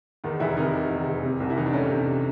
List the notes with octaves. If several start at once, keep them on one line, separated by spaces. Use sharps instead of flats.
E2 D#3 D#4
F1 E3 E4
C3 D#3 D#4
D#3
E2
F1
C3
C2
E4
E3 D#4
D4
A3 C#4
C3